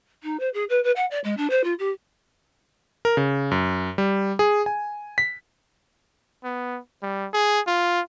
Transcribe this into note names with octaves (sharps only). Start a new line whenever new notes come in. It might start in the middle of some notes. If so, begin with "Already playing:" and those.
D#4
C5
G#4
B4
B4
F#5
D5
G#3
D4
C5
F4
G4
A#4
C#3
F#2
G3
G#4
G#5
B6
B3
G3
G#4
F4